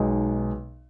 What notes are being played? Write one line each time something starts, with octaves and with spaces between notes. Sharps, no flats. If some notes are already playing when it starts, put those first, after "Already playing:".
Already playing: B1 B2 G#3 B3 D#4